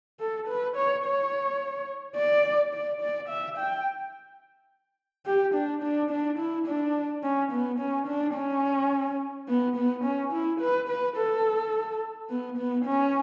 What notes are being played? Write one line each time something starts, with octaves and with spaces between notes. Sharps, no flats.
A4
B4
C#5
C#5
D5
D5
D5
E5
G5
G4
D4
D4
D4
E4
D4
C#4
B3
C#4
D4
C#4
B3
B3
C#4
E4
B4
B4
A4
B3
B3
C#4